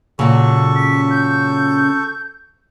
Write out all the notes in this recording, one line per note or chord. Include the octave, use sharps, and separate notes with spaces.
A#2 C#3 F#3 A4 C#6
B6
G6